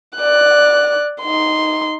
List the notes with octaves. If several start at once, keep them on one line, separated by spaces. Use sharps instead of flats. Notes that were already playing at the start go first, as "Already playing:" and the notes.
D5 F#6
D#4 C6